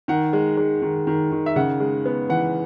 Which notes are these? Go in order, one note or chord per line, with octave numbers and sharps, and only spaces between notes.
D#3 F#5
G#3
G#3
D#3
D#3
D#3
E5
C#3 F#5
G#3
B3
E3 F#5